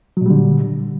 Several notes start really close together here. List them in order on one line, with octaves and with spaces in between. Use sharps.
F#3 A#2 G3 D3